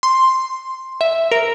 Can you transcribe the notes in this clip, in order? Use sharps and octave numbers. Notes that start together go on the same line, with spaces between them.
C6
E5
A#4